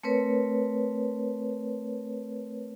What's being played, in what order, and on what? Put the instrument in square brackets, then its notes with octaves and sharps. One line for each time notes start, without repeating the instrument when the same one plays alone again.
[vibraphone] A3 C4 A#4 B4 C#5